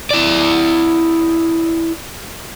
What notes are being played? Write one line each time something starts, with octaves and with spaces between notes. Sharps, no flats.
E4 D5